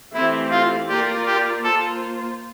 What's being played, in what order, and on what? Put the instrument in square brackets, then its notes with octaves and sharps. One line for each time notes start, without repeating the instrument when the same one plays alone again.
[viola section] E3 A3 C4 G4 [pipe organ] E4
[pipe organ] F4
[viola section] A#3 F4 A#4 D5 [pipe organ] G4
[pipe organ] G4
[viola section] A#3 F4 C5 [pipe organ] A4